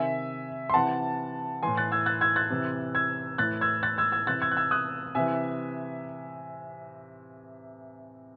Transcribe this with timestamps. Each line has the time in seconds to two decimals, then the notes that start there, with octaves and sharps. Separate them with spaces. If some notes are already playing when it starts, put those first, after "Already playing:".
Already playing: C3 D#3 E5 G#5
0.70 C6
0.74 C3 E3 F#5 A5
1.63 A2 E3 G#5 C6
1.77 F#6 A6
1.92 E6 G#6
2.06 F#6 A6
2.21 E6 G#6
2.36 F#6 A6
2.50 C3 E3
2.95 E6 G#6
3.38 A2 E3 F#6 A6
3.61 E6 G#6
3.83 F#6 A6
3.98 E6 G#6
4.12 E6 G#6
4.27 C3 E3 F#6 A6
4.42 E6 G#6
4.52 F#6
4.57 E6 G#6
4.71 D#6 F#6
5.15 C3 E3 E5 G#5